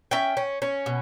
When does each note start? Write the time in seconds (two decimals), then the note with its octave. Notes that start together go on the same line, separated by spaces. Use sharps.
0.11 C#4 E5 G5
0.37 C#4
0.62 C#4
0.86 B2